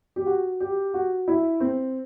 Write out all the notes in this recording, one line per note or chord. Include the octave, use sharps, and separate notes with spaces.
G4
F#4
G4
F#4
E4
C4